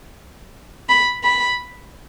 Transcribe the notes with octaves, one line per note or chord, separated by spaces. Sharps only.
B5
B5